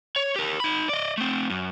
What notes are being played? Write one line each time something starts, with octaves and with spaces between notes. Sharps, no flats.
C#5
G4 A#4
D#4 B5
D5 D#5
A3 C4
F#2